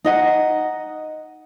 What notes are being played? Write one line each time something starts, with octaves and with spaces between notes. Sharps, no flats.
D#4 D#5 F#5